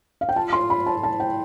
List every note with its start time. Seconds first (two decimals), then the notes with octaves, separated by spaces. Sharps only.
0.21 F5
0.29 G5
0.36 F4 A5
0.53 C6
0.70 B5
0.86 A5
1.03 E4 A5
1.20 G5